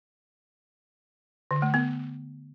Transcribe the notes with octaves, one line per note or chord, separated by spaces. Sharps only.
D3
A3
B3